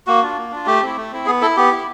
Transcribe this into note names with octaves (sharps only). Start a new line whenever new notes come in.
A#3 F#4
D4 F4
A#3
D4 F4
A3 G4
C4 E4
A3
C4 E4
B3 G#4
E4 A4
B3 G4
E4